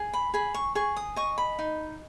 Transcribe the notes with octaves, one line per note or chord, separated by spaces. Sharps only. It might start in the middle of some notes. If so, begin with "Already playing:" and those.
Already playing: G#4
B5
G#4 B5
C#6
G#4 C#6
D#6
D#5 C#6
B5
D#4